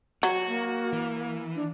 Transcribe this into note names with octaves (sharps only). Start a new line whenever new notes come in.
F#3 F#4
A#3
E3
D4